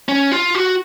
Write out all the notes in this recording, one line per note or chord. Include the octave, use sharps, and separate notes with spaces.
C#4
F4
F#4